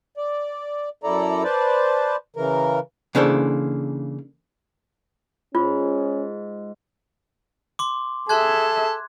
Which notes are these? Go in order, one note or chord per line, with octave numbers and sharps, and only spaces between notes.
D5
F#2 E4 A4 D5 A#5
B4 C5 D5 A5
C#3 E3 A#4
C#3 E3 A#3 D4 A4 C5
G#2 C#4 F4
C6 D6
G#4 A4 E5 C6 F#6 G#6